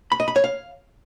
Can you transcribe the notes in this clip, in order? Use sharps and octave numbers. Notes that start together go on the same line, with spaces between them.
B5
D#5
B5
C#5
F5